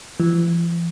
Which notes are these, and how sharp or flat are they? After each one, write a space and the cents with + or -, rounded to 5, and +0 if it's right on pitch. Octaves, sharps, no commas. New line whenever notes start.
E3 +45